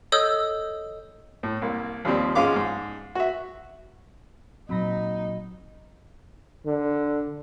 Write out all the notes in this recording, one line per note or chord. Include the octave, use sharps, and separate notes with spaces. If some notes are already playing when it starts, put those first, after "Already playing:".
A4 C#5 D#5 D#6 E6 G6
A2
C2 A#3
D#2 F3 G3 C4
G#2 F3 G#3 C#4 F5 D6
G#2
F#4 E5
A#2 F#3 C4 D#4 B5 A#6
D3